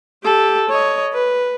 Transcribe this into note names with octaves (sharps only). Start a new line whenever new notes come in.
G4 A4
C#5 D#5
B4